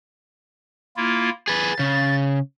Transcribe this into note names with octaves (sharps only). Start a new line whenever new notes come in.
A#3 E4 F4
G#4 B4 A6
C#3